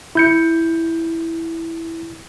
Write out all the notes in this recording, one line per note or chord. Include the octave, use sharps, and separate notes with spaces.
E4 G6 C#7